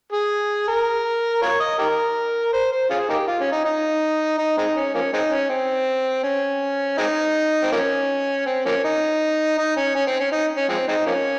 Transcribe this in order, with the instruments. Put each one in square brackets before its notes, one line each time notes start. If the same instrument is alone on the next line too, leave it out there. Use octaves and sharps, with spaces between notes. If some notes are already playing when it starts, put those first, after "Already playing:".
[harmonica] G#4
A#4
F4 A#4 C#5
D#5
D#4 G4 A#4
C5
C5
C#4 F4 G#4
A#3 D#4 G4
F4
C#4
D#4
D#4
D#4
G#3 C4 D#4
C#4
F3 A#3 C#4
G#3 C4 D#4
C#4
C4
C#4
G#3 C4 D#4
C4
F3 A#3 C#4
C4
F3 A#3 C#4
D#4
D#4
C#4
C#4
C4
C#4
D#4
C#4
F3 G#3 C4
G#3 C4 D#4
F3 A#3 C#4